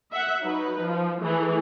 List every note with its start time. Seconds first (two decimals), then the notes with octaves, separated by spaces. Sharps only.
0.12 E5 F#5
0.42 F#3 D#4 B4
0.82 F3
1.21 E3 A3 G#4 A4